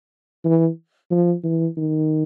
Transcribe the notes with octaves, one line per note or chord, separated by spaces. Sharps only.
E3
F3
E3
D#3